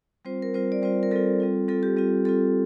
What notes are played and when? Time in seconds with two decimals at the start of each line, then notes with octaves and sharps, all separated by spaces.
0.25 G3 C4 F4 C5
0.42 A#4
0.54 G3 C4 F4 C5
0.72 D5
0.82 G3 C4 F4 C5
1.03 A#4
1.11 G3 C4 F4 A4
1.40 G3 C4 F4
1.68 G3 C4 F4 A4
1.83 G4
1.96 G3 C4 F4
2.25 G3 C4 F4 A4